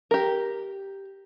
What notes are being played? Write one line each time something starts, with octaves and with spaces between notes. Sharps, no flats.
G4 A#4